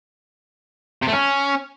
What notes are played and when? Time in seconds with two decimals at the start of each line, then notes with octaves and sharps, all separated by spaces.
1.02 C3
1.07 A3
1.13 C#4